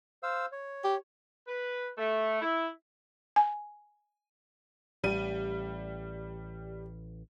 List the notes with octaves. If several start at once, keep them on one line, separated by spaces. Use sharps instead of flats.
C5 F5 E6
C#5
G4
B4
A3
E4
G#5
A1 G3 D#7